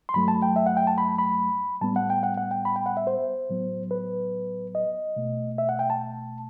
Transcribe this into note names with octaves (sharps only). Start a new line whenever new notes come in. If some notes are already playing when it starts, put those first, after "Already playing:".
C6
G2 F#3 A3 B5
A5
G5
E5
F#5
G5
A5
B5
B5
A2 G3 B3 A5
F#5
G5
F#5
F#5
G5
B5
G5
F#5
E5
C5
A2 F#3 B3
B4
D#5
B2 A3
E5
F#5
G5
A5